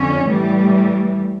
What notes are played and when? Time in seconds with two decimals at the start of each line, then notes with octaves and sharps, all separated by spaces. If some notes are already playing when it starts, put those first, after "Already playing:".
Already playing: F2 D3 C#4
0.25 A2 E3 G3